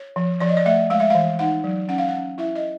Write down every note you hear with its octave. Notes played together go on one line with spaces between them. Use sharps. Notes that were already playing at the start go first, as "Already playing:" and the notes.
Already playing: C#5
F3
F3 D5
D#5
D5
A3 E5
G#3 F5
E5
E3 F5
D#4 F#5
F#3
C#4 F#5
F5
F#5
C#4
E4 E5
D#5